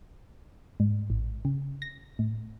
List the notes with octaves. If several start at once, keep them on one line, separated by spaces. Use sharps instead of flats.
G#2
A1
C#3
A#6
A2